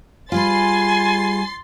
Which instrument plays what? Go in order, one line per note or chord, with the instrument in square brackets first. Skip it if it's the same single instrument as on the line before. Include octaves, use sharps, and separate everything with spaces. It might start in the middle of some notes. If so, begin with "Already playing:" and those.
[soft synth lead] G3 [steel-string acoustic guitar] F4 G#4 B4 [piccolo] G#5 [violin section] C6 A6 C7